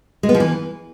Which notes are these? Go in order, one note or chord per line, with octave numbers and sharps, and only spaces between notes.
G#3
B3
F3
E3